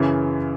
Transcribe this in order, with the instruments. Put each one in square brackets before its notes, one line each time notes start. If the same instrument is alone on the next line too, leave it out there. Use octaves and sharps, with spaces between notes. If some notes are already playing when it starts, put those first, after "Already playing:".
Already playing: [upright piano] F#2 C#3 E3